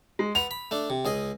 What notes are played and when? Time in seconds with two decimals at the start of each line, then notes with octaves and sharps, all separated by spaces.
0.19 G#3
0.35 B4 F#5 F7
0.51 B5
0.71 A3 D4
0.90 C3
1.05 C#2 G#4 D#5